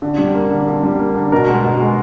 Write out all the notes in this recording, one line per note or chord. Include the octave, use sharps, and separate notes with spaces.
D3
G3
A#3
D3
D3
G3
A#3
D3
B2 A#4
G#3
B2
G#3